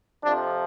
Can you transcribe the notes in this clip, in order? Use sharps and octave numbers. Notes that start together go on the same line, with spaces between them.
F2 C3 F3 D4